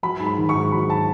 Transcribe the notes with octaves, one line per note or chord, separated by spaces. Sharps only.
F#3 B5
G#2
B5
D#3
C#6
G#2
F#3 B5
A5